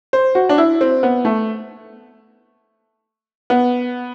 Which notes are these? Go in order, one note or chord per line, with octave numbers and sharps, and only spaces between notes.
C5
F#4
D4
E4
C4
B3
A3
B3